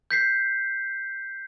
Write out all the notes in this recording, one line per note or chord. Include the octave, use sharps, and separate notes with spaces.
G6 B6 C7